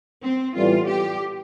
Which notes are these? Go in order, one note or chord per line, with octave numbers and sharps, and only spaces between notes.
C4
A2 E3 G3 B3 F4
G4